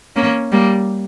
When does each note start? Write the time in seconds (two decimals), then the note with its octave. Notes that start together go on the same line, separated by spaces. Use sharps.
0.16 A#3 C#4
0.52 G3 A#3